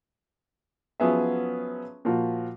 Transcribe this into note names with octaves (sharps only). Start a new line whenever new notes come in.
F3 F#3 B3 C#4 G#4 E5
A#2 F3 F#4